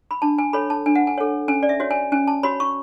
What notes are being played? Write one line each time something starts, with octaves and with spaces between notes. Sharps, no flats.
B5
D4 A5
G#5
A4 C#5 B5
A5
D4 G#5
F#5
G#5
A4 C#5
C#4 G#5
D5
E5
F#4 C#5
G#5
C#4 G#5
A5
F#4 C#5 B5
C#6